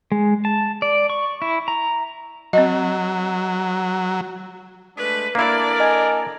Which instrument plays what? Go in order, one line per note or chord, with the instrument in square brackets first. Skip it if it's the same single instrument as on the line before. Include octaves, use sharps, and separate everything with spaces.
[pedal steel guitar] G#3
A5
D5
C#6
E4
A#5
[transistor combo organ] F#3 [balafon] C4 D#5
[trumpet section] G#3 A3 D4 [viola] B4
[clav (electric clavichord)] A#3 E4 [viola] D4 D5 [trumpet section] A4 A#4
[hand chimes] D#5 G#5 G#6